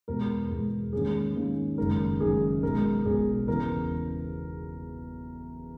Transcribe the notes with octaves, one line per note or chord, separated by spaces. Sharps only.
E2 B2 G#3 B3 A#4
E2 B2 G#3 B3
G#2 D#3 A#3 C#4 G#4
G#2 D#3 A#3 C#4
F#1 F#2 D#3 G#3 A#4
F#1 F#2 D#3 G#3 G#4
B1 B2 G#3 A#4
B1 B2 G#3 G#4
E2 C#3 E3 B3 A#4